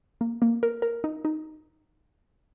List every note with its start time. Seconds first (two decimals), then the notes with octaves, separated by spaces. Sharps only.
0.21 A#3
0.42 A#3
0.63 A#4
0.82 A#4
1.04 D#4
1.25 D#4